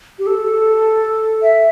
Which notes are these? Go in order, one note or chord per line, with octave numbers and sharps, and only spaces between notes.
G4
A4
E5